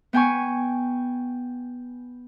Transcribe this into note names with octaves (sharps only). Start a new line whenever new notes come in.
B3 G5 G#5 C#6